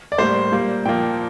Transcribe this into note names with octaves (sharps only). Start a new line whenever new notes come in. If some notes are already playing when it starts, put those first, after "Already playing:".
D5
A2 G3 A#3 C5
A#2 G3 A#3
A#2 F3 A#3 G5